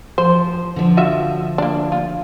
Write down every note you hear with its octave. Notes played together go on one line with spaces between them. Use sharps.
F3 C5
D3 F3
F4 F#4 E5
A#3 D4
F4